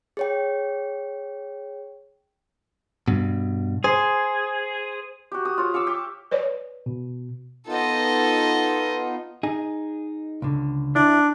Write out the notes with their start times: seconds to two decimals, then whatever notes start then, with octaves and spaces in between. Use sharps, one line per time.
0.17 G#4 C#5 G5
3.08 G2 B2
3.84 G#4 C5
5.32 F#4 G4
5.45 D#6
5.58 F4 C#5
5.74 F5 C#6 D6 E6
5.87 G4
6.31 B4 C#5 D5
6.86 B2
7.67 B3 D#4 F4 A4 D#5
9.43 D#4 G#4
10.42 C#2 D3
10.96 D4 E4